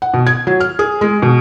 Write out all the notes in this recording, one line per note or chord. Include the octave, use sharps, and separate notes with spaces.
F#5
B2
G#6
F#3
F6
G#4
G#3
B2